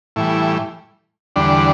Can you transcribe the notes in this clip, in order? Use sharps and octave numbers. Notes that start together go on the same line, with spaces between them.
A2 E3 G3 E4
E2 D3 G3 D4